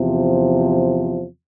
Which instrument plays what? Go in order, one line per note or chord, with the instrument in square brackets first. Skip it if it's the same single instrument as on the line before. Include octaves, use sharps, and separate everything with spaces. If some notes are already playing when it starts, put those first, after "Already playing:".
Already playing: [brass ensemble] E2 C3 F3